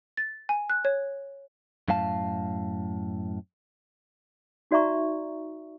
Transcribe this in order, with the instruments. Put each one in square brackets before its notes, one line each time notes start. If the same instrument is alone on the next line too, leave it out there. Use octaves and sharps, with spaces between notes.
[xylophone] A6
G#5
F#6
C#5
[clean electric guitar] F#2 A2 F5 A5
[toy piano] D#4 F#4 D5 E5 A#5 C#6